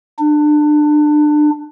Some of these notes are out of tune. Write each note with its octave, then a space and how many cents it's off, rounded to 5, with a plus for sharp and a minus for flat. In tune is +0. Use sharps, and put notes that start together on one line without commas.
D4 +30